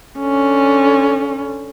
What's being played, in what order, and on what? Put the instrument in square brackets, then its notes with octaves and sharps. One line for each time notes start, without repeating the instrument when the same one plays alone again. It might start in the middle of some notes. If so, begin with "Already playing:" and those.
[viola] D3 C#4